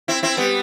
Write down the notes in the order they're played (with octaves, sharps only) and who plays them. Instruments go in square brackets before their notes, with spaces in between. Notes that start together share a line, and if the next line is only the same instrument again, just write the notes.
[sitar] C4 E4
C4 E4
G3 B3